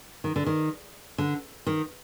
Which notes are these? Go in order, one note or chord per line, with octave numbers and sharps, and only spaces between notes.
D#3
D3
D#3
D3
D#3